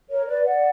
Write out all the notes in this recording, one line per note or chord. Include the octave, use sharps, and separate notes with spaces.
A#4 C#5
B4 D5
D5 F#5